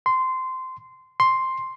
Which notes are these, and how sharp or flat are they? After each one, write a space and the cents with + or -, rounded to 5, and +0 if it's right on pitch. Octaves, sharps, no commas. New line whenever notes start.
C6 -15
C6 +5